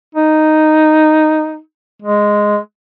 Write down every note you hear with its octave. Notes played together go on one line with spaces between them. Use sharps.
D#4
G#3